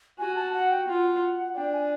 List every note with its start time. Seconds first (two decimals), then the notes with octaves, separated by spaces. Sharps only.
0.19 F#4 G#5
0.36 A5
0.53 F#5
0.70 G5
0.88 F4 F#5
1.56 D4 G5
1.73 G#5